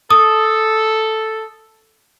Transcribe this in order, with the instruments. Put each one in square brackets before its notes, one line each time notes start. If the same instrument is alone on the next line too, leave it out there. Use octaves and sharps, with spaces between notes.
[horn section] A4 [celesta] D#6